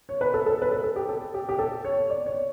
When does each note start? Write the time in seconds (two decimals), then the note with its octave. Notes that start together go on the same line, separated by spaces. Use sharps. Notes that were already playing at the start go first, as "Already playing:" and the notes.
0.09 C#5
0.21 B4
0.34 A4
0.46 A4
0.62 B4
0.72 A4
0.84 A4
0.96 G4
1.09 A4
1.34 G4
1.49 G4
1.59 A4
1.85 C#5
2.10 D5
2.26 C#5